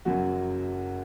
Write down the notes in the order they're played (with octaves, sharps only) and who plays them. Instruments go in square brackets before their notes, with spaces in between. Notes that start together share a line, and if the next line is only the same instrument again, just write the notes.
[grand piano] F#1 F#2 F#3 F#4